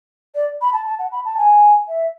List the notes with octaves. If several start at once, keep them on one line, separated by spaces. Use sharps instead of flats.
D5
B5
A5
A5
F#5
B5
A5
G#5
E5